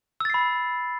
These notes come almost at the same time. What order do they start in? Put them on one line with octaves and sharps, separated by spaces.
E6 A6 C7 B5